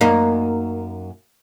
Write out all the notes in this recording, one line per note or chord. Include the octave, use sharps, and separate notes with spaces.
F#2 A#3 D#4